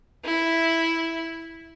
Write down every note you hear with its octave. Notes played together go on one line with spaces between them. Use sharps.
E4 E5